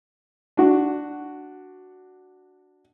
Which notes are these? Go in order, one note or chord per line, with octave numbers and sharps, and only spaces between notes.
D4 F#4